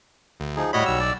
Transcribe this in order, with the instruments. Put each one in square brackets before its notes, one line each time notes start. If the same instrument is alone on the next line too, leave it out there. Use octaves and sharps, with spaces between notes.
[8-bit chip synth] D2
[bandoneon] F3 D#4 G#4
[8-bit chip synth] A2 D#5 B5 [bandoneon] G3 F#4 C#5
[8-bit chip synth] B1 E6
[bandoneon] D5